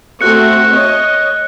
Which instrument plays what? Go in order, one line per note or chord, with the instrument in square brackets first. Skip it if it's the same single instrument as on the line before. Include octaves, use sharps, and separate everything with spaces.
[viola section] A3 C4 F#4 [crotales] F#6 C#7
[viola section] C#5 D#5